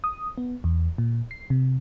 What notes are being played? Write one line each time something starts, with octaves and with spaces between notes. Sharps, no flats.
D#6
B3
E2
A#2
C7
C3